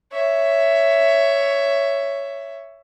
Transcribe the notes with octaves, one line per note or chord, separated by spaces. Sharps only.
C#5 E5